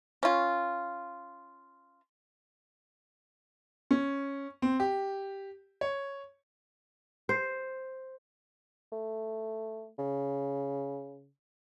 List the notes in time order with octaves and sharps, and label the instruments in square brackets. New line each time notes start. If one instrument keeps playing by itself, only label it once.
[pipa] C#4 F4
[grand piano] C#4
C4
G4
C#5
[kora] C5
[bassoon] A3
C#3